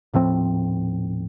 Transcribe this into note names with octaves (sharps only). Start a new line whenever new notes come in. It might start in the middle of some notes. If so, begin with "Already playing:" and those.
D#1 A2 F3 C4